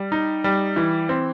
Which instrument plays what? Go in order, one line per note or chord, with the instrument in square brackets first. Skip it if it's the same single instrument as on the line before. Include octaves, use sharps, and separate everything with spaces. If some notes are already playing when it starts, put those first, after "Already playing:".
Already playing: [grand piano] G3
D#4
G3
E3
C4